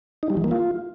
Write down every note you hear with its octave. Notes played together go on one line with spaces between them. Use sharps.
D#4
G3
E3
A#3
F4